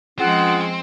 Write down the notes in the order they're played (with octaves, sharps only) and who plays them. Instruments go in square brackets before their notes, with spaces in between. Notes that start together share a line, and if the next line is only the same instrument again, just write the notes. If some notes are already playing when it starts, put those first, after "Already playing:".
[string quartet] F3 G#3 [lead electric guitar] C4 [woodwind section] C#4 F4 G#4 [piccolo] F#5